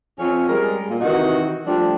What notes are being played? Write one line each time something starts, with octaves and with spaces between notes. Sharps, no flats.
F2 C#4
G3 G#3 A#4
A#2
C3 D#3 E3 D#4 F#4
F3 G3 A3 D4